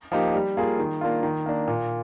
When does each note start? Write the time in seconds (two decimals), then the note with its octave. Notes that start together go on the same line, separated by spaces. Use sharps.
0.12 F3 A#3 D#4 G4
0.35 G3
0.57 A#3 F4 G#4
0.79 D#3
1.01 A#3 D4 F4
1.23 D#3
1.46 A#3 D4
1.68 A#2